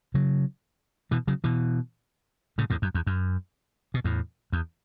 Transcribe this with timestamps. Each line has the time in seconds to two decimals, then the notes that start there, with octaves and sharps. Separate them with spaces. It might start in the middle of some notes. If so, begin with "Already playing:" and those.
0.14 C#3 F#3
1.11 B2 E3
1.27 C#3 F#3
1.44 B2 E3
2.58 A2 C#3
2.70 E2 A2
2.82 F#2
2.94 E2
3.07 F#2
3.94 B2
4.04 E2 A2
4.52 E2